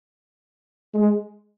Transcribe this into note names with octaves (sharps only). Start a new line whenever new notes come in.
G#3